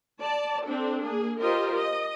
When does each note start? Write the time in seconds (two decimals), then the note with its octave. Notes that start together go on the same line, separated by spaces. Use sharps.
0.22 D5 A5
0.65 C4 D4 A4
1.04 A#3 G#4
1.41 F4 G4 A#4 C5 D#5
1.75 D#5